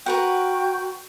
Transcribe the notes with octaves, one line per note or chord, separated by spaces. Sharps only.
F#4 A#4 B4 F#5 G5